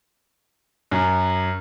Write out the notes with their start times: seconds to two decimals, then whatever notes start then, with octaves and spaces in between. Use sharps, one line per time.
0.91 F#2